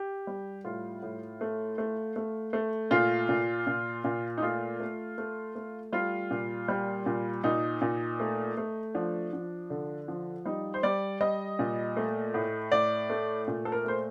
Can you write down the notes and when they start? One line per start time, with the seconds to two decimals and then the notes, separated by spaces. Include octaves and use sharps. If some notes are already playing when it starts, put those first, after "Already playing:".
Already playing: G4
0.27 G3
0.64 A2 F4
1.02 A2
1.41 A3
1.78 A3
2.16 A3
2.53 A3
2.91 A#2 F4
3.29 A#2
3.67 A#2
4.04 A#2
4.37 D#4
4.42 A3 F4
4.80 A3
5.18 A3
5.55 A3
5.93 G3 F4
6.31 A#2
6.68 G3
7.06 A#2
7.44 A#2 D#4
7.81 A#2
8.20 A3
8.57 A3
8.95 F3 D4
9.33 F3
9.70 D3
10.08 F3
10.45 G3 D#4
10.74 C5
10.83 G3 D5
11.21 G3 D#5
11.59 A#2
11.97 A3
12.34 A2
12.72 A2 D5
13.10 A3
13.48 A#2
13.65 A4
13.72 A#4
13.85 A3 C5